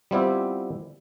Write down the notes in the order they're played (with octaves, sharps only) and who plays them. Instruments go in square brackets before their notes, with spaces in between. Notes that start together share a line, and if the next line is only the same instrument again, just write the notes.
[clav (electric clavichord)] G3 B3 C4 E4 F4 G4